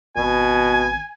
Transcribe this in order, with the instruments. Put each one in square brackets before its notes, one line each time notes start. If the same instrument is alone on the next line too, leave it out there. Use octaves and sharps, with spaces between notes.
[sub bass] G#1 [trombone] B2 [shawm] G#5